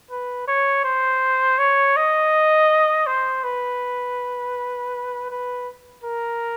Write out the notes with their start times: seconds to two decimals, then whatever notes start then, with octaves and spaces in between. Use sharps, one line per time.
0.11 B4
0.48 C#5
0.84 C5
1.58 C#5
1.97 D#5
3.07 C5
3.44 B4
5.30 B4
6.04 A#4